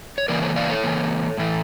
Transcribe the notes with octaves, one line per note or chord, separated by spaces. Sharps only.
C#5
C#3 E3 A#3 A#4 D5
A4 C#5
D5 F5
A4 C#5
C#3 E3 A#3
A2 E3 A3